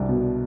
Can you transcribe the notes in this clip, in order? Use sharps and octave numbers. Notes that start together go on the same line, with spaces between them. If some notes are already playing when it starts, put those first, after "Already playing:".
Already playing: C2 D4
B2